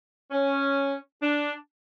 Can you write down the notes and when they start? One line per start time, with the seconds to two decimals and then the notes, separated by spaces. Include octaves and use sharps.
0.31 C#4
1.20 D4